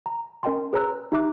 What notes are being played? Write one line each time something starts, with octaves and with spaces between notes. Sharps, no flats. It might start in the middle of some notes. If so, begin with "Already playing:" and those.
A#5
C#4 A#4 D#5 G5 A5 C6
G#4 B4 C#5 A#5 E6 F#6
D#4 G4 E5 A#5 D6 F#6